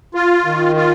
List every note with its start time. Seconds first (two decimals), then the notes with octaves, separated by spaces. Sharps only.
0.15 F4
0.45 D#3
0.76 F4